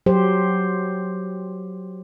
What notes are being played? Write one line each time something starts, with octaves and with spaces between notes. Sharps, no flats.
F#3 G4 C5